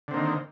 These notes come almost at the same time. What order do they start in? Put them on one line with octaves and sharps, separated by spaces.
D3 C4 A#3 D#3